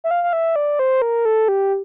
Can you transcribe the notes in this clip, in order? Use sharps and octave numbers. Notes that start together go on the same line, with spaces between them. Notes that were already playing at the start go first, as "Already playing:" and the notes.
E5
F5
F5
E5
D5
C5
A#4
A4
G4